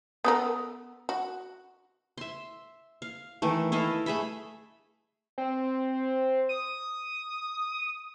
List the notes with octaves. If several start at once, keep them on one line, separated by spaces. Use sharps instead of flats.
B3 A4 A#4
F#4
E5 C6
F5
D#3 E3 A3
E4 A4 D#5 F5
A3 G#4 E5 B5
C4
D#6